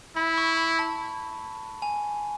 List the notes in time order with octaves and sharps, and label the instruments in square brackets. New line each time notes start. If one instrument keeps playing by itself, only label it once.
[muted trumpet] E4 [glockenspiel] B5
[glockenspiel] C#6
B5
A5
G#5